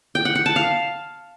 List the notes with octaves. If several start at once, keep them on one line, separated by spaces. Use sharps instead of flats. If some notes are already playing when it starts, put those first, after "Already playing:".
G5
F#5
F#5
A5
F5